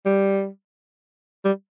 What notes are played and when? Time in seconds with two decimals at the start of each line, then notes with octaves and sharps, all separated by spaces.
0.05 G3
1.45 G3